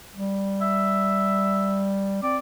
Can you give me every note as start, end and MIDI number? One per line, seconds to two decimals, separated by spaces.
0.13 2.18 55
0.62 1.89 76
2.23 2.38 60
2.23 2.37 74